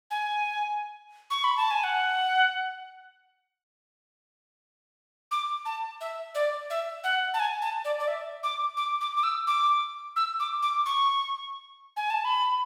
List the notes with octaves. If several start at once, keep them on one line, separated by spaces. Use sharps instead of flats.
G#5
C#6
B5
A5
G#5
F#5
D6
A5
E5
D5
E5
F#5
A5
G#5
A5
D5
D5
E5
D6
D6
D6
D6
E6
D6
E6
D6
D6
C#6
G#5
A5
B5